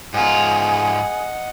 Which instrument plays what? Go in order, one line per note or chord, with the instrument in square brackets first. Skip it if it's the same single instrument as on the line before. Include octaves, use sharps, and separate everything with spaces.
[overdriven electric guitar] G#2 F4 [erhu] G#4 [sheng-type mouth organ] D#5 F#5